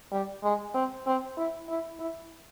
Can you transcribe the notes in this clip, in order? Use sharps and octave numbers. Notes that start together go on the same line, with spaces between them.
G3
G#3
C4
C4
E4
E4
E4